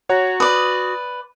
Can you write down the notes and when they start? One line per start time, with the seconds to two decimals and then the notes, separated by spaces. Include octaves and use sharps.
0.09 F#4 C#5 F#5 A#5
0.40 B4 D5 D#6